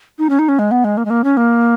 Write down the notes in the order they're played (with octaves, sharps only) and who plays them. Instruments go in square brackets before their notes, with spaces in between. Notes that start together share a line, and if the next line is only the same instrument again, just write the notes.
[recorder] D#4
C#4
D#4
C#4
G#3
B3
G#3
A#3
G#3
A#3
C#4
A#3